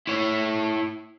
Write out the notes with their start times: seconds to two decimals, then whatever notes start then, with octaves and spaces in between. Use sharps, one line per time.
0.07 E4 C#5